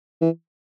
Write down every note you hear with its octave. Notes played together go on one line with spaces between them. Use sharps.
E3